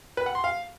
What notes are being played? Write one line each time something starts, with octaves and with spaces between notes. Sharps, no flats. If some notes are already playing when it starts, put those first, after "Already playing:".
B4
F#5
C6
F5